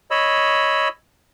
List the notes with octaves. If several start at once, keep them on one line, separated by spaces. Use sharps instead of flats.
C#5 D#5 B5 E6